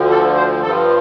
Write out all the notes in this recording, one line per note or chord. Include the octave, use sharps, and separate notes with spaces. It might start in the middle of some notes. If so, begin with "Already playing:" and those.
Already playing: D2 D3 F3
A4
C5
G2 F3 A4